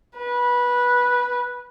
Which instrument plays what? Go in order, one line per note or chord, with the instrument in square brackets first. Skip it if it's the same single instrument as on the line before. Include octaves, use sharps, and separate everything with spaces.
[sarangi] B4